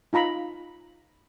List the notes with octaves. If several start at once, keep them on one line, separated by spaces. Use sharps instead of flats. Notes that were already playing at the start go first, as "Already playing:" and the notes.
D#4 F4 A#5 B5